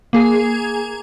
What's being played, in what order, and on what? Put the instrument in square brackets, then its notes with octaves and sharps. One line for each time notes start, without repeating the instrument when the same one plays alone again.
[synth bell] A#3 G#4 G#5